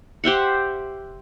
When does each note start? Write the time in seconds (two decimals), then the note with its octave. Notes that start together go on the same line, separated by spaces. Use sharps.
0.24 G4 C5 E5 F#5